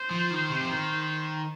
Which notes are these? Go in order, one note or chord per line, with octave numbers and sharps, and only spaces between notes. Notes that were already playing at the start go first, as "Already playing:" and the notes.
Already playing: C5
F3
D#3
C3
F3
D#3